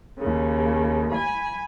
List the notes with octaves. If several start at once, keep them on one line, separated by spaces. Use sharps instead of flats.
D#2 C#3
G#5 B5